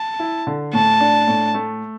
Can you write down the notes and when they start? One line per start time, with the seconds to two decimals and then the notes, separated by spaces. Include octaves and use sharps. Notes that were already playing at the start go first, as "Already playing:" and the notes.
Already playing: A5
0.20 E4
0.47 D3
0.73 A2 A5
1.00 D4
1.28 A2
1.54 A3